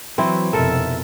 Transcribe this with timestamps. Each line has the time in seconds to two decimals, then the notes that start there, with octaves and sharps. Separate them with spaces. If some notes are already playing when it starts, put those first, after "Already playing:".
0.18 E3 F#3 C4 E4
0.53 F1 B2 A4 A#4 E5